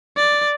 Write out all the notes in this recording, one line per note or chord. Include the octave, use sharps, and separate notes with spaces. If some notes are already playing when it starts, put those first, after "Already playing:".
D5